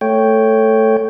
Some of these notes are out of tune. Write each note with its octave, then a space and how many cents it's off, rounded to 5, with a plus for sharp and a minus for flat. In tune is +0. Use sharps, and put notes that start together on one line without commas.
A3 +5 C#5 +0 G5 -5